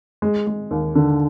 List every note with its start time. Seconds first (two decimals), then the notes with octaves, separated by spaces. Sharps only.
0.22 G#3
0.47 G#3
0.71 D#2
0.95 D3